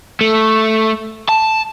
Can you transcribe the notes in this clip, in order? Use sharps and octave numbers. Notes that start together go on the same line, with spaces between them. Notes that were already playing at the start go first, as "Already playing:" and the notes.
A3
A5